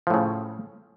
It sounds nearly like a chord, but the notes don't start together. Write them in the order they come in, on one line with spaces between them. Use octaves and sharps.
F3 A2 C#3